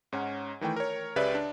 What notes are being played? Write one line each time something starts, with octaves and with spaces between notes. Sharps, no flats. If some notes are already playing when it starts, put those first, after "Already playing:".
G#2 C#4 D#4 F#5
D#3 E3 A3 G5
A#4 C#5
C#2 C#3 G4 B4 D5 E5
D4